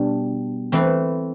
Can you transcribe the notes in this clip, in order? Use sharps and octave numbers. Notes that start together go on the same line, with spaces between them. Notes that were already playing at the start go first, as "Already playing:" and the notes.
Already playing: B2 G3 D4
E3 A3 C4 E4 B4